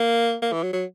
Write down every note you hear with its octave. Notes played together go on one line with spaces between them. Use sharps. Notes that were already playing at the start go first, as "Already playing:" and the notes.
Already playing: A#3
A#3
E3
F#3
F#3